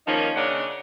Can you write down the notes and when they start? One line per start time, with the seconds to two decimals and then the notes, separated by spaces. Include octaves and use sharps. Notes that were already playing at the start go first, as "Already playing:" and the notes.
0.07 D#3 F3 A#3 C#4 D#4
0.35 C#3 A#3 C#4 D4 D#5 F#5